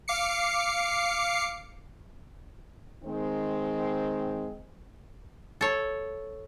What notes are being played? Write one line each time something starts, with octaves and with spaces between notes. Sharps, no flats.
F5 D6 C7 C#7
D#3 G#3 C4
A4 C#5